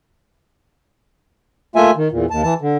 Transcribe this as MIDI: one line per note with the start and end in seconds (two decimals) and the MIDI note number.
1.76 1.91 57
1.76 1.91 58
1.76 1.91 65
1.76 1.91 76
1.76 1.91 80
1.96 2.08 51
2.12 2.26 40
2.12 2.26 46
2.30 2.43 39
2.30 2.43 81
2.43 2.54 52
2.43 2.54 81
2.61 2.77 50